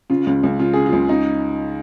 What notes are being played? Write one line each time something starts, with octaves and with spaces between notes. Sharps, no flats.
C#3 F4
C#2
C#2
C#3 F4
C#3 G#4
F4
C#2
C#3 D#4